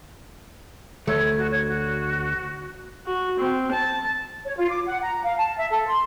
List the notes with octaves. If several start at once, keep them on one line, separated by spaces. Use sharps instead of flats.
D2 A3 C#5
F#4
C#5
F#4
F#4
C4
A5
C#5
F4
D6
F#5
A#5
F5
A5
E5
A4
C6